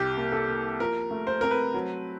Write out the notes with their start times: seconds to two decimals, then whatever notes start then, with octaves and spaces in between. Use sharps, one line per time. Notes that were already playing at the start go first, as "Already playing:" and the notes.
Already playing: C2 G4
0.17 A#3
0.32 A4
0.49 A#3
0.80 F3 A#4
1.11 A3
1.27 C5
1.41 C4 A#4
1.51 B4
1.74 F#3